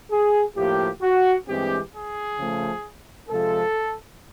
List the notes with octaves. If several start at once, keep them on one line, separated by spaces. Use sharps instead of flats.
G#4
A2 F3 A#3 G4
F#4
G2 E3 G#3 C4 G4
G#4
C#3 F3 A3
C3 F3 G#3 A4